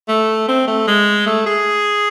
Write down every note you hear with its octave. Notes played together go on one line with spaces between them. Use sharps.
A3
C4
A3
G#3
A3
G#4